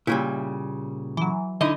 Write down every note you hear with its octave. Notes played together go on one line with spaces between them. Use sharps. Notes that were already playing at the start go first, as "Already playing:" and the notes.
A#2 C#3 G3 E4
E3 F#3
D3 D#4 E4 D#5